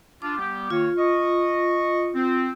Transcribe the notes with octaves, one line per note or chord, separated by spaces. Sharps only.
D4 F4 D6
G3 B3 G4
D#3 A#3 F4 C#5
D#5 C#6
C4